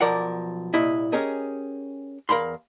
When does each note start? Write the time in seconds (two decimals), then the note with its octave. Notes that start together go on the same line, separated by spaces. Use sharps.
0.01 B1 F3 A#4 D5 F#5
0.74 C2 A#2 E4 D#5
1.12 C#4 G4 G#4 A#4 D#5
2.29 E2 A#4 F5 B5 C6